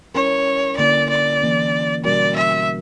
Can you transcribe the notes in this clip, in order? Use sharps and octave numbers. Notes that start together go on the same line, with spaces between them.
G3 C#4 E4 A#4 C#5
D3 A#3 E4 D5
D5
E3 A#3 C#4
B2 G3 C#4 F#4 A#4 D5
E5